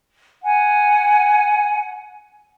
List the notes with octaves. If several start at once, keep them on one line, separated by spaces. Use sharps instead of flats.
F#5 G#5